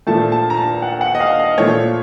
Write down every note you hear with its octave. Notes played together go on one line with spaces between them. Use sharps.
A#2 F3 A3 A5
A5
A#5
A5
F#5
F#5
D#5
F5
D#5
A#2 F3 A3 C#5